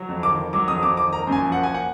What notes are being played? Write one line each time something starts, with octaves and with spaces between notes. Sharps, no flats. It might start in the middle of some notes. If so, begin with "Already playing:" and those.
Already playing: F#3
F2
D#3 D6
D#3
F#3 D6
F2 D#6
F2 D6
D#3 D6
A#3 A#5
F#2
G#5
F3
F#5
A#3
G#5
F#5